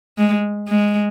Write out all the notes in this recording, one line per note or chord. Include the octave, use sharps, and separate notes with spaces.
G#3
G#3